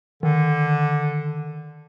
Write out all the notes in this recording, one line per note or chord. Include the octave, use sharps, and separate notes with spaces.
D3 D#3